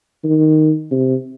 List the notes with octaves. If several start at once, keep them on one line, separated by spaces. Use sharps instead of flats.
D#3
C3